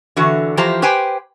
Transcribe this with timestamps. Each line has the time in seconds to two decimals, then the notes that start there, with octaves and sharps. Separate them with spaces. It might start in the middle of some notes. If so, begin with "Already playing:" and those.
0.16 D3 E3 F#4
0.57 E3 F3 G4 C5 A#5
0.82 G4 B4 C5 G5 G#5